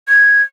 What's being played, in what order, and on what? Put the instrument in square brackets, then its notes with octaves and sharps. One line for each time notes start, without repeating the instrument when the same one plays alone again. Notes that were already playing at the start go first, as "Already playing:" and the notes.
[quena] G#6